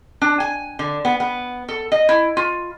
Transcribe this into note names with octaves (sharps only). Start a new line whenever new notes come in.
D4
G#5
D3
B3
B3
A4
D#5
E4
F4